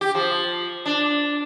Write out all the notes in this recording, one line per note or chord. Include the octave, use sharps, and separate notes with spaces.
G4
F3
D4